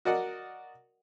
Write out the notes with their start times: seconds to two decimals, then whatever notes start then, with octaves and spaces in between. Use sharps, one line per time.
0.05 F#4 A#4 D5 D#5 F#5